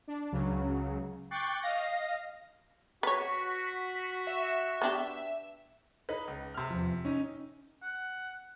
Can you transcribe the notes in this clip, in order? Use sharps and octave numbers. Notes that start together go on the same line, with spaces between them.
D4
C#2 C#3 F#3
G5 C#6 D6 F#6 A6 C7
D#5 F5 A#6
F#4 B4 C#5 B6
E5
B3 D4 G4
D#4 B4
C#2
C3 F6
E2 F3
C#4 D#4
F#5